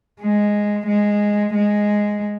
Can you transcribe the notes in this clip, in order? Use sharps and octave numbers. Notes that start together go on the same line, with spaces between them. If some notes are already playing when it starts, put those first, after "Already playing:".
G#3
G#3
G#3